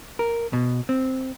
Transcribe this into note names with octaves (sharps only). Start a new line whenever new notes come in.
A#4
B2
C4